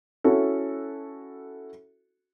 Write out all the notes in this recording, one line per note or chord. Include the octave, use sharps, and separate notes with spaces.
C#4 E4 F#4 A4